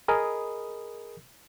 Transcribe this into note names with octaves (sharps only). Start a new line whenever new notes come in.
G#4 A#4 D#5 B5 D#6